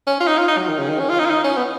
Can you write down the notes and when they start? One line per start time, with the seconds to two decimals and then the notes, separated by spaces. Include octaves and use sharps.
0.07 C#4
0.20 F4
0.27 D#4
0.38 F4
0.48 D#4
0.58 F#3
0.69 D#3
0.79 C#3
0.89 D#3
0.99 C#4
1.09 F4
1.19 D#4
1.25 F4
1.30 D#4
1.44 C#4
1.57 B3